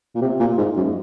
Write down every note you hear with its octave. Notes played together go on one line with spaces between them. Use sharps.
A#2
C3
A#2
G#2
F#2